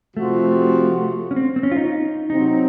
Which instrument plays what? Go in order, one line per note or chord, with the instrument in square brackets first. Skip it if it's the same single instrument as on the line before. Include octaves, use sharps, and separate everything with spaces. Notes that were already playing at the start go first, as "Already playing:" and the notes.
[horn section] C3 F3 C4 F#4 [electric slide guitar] A3
[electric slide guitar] C#4
C4
C4
C#4
F4
D#4
[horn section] C3 F#3 C4 [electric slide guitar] D#4